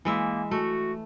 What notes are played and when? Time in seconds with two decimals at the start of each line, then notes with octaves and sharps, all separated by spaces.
0.05 E3 G#3 A#3 E5
0.51 A3 F#4